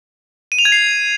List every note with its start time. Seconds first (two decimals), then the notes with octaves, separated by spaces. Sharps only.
0.52 D#7
0.59 F7
0.65 G#6
0.72 C7